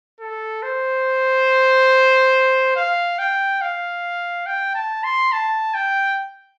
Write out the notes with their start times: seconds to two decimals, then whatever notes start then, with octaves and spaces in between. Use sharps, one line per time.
0.20 A4
0.63 C5
2.76 F5
3.19 G5
3.61 F5
4.46 G5
4.75 A5
5.04 C6
5.32 A5
5.74 G5